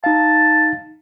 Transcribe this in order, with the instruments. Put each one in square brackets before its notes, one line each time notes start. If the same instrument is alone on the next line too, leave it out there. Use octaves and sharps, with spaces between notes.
[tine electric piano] D#4 F5 [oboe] A5